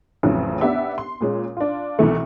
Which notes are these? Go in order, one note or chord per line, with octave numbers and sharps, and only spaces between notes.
A1 F2 C#3 F#3
B3 D4 G4 E5
C6
A#2 G#3 C#4
D4 F4
C2 B2 E3 A3